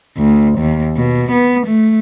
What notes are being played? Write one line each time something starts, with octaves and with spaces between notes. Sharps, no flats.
D2
D#2
B2
B3
A3